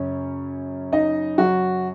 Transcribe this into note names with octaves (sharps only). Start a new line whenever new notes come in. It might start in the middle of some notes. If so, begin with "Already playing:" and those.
Already playing: F#2 C#3 C#4 C#5
D#4 D#5
F#3 F#4